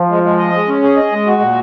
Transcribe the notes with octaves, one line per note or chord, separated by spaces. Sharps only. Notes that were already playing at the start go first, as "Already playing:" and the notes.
Already playing: F3
G#3
G#3
D#5
G#3
C#4
G#4
D#5
G#3
F#4
A#2